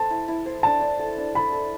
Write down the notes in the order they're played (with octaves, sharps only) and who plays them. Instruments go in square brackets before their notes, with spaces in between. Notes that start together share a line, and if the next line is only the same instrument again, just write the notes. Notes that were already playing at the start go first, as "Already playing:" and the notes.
Already playing: [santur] A4 C5 [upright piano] A5
[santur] E4
E4
C5
[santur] D4 [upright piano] A5
[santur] D4
A4
D4
[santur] A4 [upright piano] B5
[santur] A4